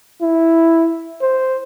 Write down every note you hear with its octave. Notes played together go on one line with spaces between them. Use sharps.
E4
C5